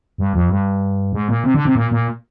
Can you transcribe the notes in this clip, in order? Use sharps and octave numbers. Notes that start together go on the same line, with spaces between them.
G2
F2
G2
G#2
A#2
C3
D3
C3
A#2
A#2